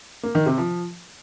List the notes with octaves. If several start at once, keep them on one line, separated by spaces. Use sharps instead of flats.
A#3
D#3
C3
F3